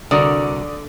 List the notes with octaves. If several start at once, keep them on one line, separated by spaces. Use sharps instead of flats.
C2 D3 F#4 A#4 D5 D#6